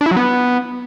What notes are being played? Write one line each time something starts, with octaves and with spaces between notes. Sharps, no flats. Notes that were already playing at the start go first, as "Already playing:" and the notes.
D4
E4
F#3
B3